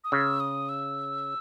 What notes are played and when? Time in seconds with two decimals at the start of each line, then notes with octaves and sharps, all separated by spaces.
0.04 D#6
0.12 C#3 E6
0.40 D#6
0.69 E6